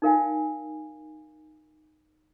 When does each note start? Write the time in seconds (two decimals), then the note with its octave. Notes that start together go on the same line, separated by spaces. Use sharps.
0.02 D#4 F4 A#4 F5 F#5 G#5